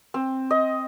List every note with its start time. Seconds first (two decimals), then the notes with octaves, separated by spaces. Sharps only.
0.14 C4
0.51 D#5